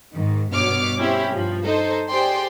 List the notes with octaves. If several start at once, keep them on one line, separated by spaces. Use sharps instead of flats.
G#2 D#3
G2 B2 C#5 D6 F6
C4 C#4 E4 G4
G2 F3
D#4 A4 C5
G4 G#4 C5 D5 G5 C6